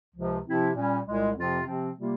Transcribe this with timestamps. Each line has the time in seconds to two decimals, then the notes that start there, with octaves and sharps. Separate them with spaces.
0.15 C#2 C3 F3
0.45 C3 F3 C4 E4
0.75 A#2 G3 C#4
1.05 C2 A#2 G#3
1.36 F2 C3 F3 C4 F4
1.66 C3 F3 C4
1.97 C3 G3 A#3 F4